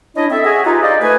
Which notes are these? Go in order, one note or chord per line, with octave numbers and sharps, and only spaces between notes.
C#4 D4 E4 D#5
A3 C4 A4 E5
F#4 G#4 D#5 E5 G#5
D#4 F4 G4 B4 G#5 A#5
F4 G#4 C5 D5 D#5
A3 B4 G#5